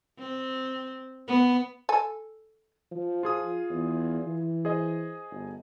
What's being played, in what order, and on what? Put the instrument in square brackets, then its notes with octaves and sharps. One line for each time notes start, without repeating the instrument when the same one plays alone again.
[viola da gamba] C4
B3
[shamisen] A4 G#5
[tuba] F3
[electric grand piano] F4 G#4 D#6
[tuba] E2
E3
[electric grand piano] G#4 C5 D#5
[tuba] G1